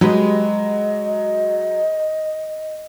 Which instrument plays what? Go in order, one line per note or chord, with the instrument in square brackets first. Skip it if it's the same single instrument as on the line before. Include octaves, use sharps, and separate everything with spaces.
[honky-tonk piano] F#3 [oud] G#3 G4 B4 [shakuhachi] D#5